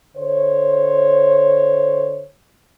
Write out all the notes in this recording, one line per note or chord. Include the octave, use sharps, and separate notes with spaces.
D3 C5 C#5